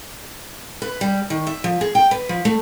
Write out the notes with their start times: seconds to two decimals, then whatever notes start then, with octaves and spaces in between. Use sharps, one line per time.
0.82 B4
1.01 G3
1.30 D#3
1.47 E5
1.64 F3
1.81 G#4
1.95 G5
2.11 B4
2.29 F3
2.45 A3